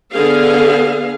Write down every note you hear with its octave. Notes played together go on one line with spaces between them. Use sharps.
D3 B3 G#4 F5